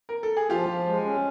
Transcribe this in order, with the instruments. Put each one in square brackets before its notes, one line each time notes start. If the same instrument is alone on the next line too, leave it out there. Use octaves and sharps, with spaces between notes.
[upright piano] A#4
A4
G#4
[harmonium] F3 [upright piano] F4 G4
[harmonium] F3
G#3
C#4